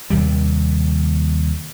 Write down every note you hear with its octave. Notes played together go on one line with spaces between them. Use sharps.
D#2 C3 G3